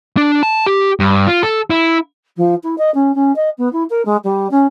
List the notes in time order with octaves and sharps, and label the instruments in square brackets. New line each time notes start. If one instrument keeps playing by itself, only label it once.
[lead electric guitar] D4
A5
G4
G2
F4
A4
E4
[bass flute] F3
E4
D#5
C#4
C#4
D#5
B3
E4
A#4
G#3
G3
C#4